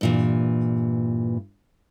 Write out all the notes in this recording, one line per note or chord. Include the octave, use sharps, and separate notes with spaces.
G2 A#2 E3